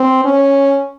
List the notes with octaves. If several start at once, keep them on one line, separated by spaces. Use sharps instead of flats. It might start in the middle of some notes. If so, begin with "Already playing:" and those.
Already playing: C4
C#4